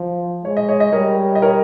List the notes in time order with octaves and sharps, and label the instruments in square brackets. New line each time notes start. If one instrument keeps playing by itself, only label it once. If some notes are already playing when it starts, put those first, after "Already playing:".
Already playing: [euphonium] F3
[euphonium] G#3 [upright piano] C#5
[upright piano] D#5
C#5
D#5
[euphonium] G3 [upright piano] A#4 C#5
[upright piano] D#5
A#4 C#5